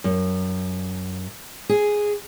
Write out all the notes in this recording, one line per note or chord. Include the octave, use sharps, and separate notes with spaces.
F#2
G#4